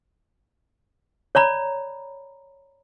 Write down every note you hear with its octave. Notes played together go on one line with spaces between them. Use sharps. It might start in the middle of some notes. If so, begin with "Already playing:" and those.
C#5 D5 A#5 B5